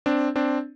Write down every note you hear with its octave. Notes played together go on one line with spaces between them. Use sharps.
C4 D4
C4 D4